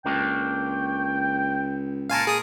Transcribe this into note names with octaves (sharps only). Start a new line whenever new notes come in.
C#2 A3 A#3 D4 G5
A#2 F4 A#4 F5 G#5 A5
G#4 D#6